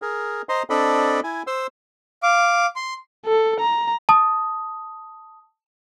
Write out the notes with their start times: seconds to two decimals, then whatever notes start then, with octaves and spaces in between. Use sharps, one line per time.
0.02 G#4 A#4
0.49 C5 D#5 A#5 C6
0.70 C4 D4 A4 D5 D#5 B5
1.24 E4 G#5
1.47 C5 C6 E6
2.23 F5 D6
2.76 C6
3.26 A4
3.60 A#5
4.09 A5 D#6